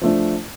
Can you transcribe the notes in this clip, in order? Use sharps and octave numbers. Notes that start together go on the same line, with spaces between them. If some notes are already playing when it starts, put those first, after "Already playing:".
F3 A3 D4